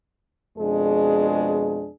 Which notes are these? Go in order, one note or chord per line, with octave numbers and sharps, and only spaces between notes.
F2 B2 G#3 D4 G#4